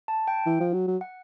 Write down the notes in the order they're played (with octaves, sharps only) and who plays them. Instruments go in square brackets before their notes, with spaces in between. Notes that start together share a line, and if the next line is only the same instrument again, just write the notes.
[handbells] A5
G5
[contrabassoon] E3
F3
F#3
F#3
[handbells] F#5